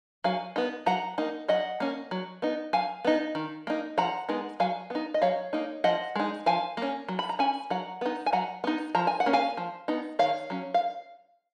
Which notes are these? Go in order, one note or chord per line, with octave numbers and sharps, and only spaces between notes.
F#3 F5 G#5
B3 D#4
F#3 F#5 A#5
A#3 D#4
F#3 D#5 F#5
A#3 C#4
F#3
B3 D#4
F#3 F5 G#5
B3 D#4
D#3
A#3 D#4
F3 F#5 A#5
G#3 B3 D#4
F#3 F5 G#5
B3 D#4
D#5
F#3 C#5 F5
A#3 D#4
F3 D#5 F#5
G#3 D#4
F3 F5 G#5
A#3 C#4
F#3
B5
A#5
C#4 G#5 B5
F#3 F#5 A#5
B3 D#4
G#5
F#3 F#5 A#5
B3 D#4
F3 A#5
G#5
F#5
A#3 C#4
F5 G#5
F3
B3 D#4
D#3 C#5 F5
F#3 C#4
F5